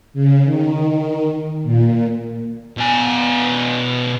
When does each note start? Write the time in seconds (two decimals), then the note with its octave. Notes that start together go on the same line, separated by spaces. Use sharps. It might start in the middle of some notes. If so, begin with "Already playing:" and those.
0.14 C#3
0.45 D#3
1.64 A#2
2.77 B2 G#5